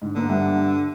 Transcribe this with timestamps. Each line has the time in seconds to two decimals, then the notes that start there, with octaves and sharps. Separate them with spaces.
0.02 G#2 D3
0.15 D3 A#3 B3 D4
0.29 G2 E5 F#5